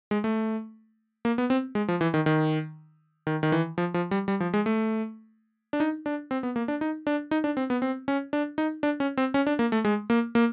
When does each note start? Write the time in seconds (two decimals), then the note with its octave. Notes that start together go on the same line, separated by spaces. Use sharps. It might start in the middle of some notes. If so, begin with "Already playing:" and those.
0.11 G#3
0.24 A3
1.25 A#3
1.38 B3
1.50 C4
1.75 G#3
1.88 F3
2.01 E3
2.14 D#3
2.26 D#3
3.27 D#3
3.43 D#3
3.52 E3
3.78 F3
3.94 F3
4.11 G3
4.28 G3
4.40 F3
4.54 G#3
4.66 A3
5.73 D4
5.80 D#4
6.06 D4
6.31 C4
6.43 B3
6.56 A#3
6.68 D4
6.81 D#4
7.07 D4
7.31 D#4
7.44 D4
7.57 C4
7.70 B3
7.82 C4
8.08 C#4
8.33 D4
8.58 D#4
8.83 D4
9.00 C#4
9.17 C4
9.34 C#4
9.47 D4
9.59 A#3
9.72 A3
9.85 G#3
10.10 A#3
10.35 A#3